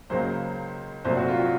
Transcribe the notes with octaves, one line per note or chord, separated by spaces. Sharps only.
C#2 C#3 F#3 A#3 C5
C2 A#2 F#3 A3 C5
F#4
F4
F#4